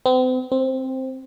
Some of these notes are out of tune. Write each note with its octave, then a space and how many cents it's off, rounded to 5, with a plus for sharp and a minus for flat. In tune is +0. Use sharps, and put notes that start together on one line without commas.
C4 -40
C4 +5